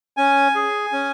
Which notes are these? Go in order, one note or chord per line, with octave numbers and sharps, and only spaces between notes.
C#4 G#5
G#4
C#4